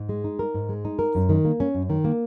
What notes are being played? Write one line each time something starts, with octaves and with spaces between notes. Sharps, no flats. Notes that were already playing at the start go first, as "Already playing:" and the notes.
Already playing: G#2
G#3
D#4
A#4
G#2
G#3
D#4
A#4
F#2
D#3
A#3
C#4
F#2
D#3
A#3